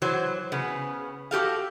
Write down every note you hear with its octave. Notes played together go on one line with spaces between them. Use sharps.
E3 F#3 C5
C#3 B3
F#4 G4 A4 F5